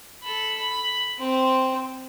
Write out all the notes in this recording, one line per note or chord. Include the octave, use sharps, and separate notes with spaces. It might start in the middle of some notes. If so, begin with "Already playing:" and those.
A4 B5
B5
C4 C5